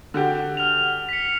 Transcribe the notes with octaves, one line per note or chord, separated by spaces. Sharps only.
D3 F#4 G4
F6 F7
B6 C#7